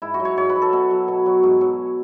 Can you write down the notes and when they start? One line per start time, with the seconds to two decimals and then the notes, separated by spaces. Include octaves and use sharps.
0.02 G#2 E4
0.14 F#4
0.20 F#3
0.25 C#5
0.37 G#2 C#5
0.49 B4
0.55 F#3
0.62 A4
0.73 B2 A4
0.91 F#3
1.08 B2
1.26 F#3
1.43 G#2
1.61 F#3